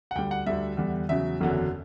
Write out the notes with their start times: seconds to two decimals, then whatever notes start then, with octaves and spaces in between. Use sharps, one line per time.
0.11 F#5
0.16 D2 D3 G3 G5
0.31 F#5
0.46 D2 D3 G3 E5
0.77 E2 D3 G3
1.09 E2 C#3 F#3 E5
1.41 F#1 E2 D3 F#3